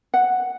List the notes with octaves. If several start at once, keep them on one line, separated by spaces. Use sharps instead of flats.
F#5